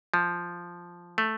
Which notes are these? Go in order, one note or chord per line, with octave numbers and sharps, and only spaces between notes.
F3
A3